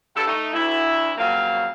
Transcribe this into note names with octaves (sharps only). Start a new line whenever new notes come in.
G2 D3 G4 A4
A3 D#4
D2 E4
F2 C#3 F#3 A#3 F5